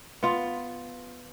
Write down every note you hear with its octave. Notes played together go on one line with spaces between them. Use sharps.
B3 F4